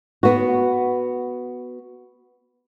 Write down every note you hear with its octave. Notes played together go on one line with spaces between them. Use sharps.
B3 F#4